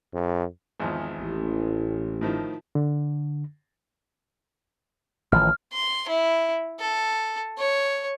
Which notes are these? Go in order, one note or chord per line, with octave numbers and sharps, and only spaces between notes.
F2
G#1 E2 F3
A1
A2 D#3 F3
D3
A1 D#3 F3 F6
C6
E4
A4
C#5